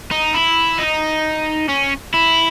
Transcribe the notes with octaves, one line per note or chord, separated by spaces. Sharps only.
D#4
E4
D#4
C#4
E4